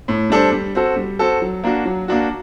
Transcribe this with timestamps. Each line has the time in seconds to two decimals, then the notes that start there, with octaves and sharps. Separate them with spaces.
0.08 A2
0.30 G3 D4 A4 C5
0.52 G3
0.75 C4 F#4 A4
0.96 G3
1.19 C4 F#4 A4
1.42 F#3
1.63 A#3 D4 F#4
1.85 F#3
2.08 A#3 D4 F#4